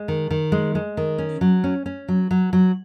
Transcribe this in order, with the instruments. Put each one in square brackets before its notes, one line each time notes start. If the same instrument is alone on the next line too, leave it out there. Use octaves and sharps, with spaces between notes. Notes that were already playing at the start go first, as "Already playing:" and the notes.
Already playing: [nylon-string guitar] G#3
D#3
D#3
G#3
G#3
D#3
C#4
F#3
C#4
C#4
F#3
F#3
F#3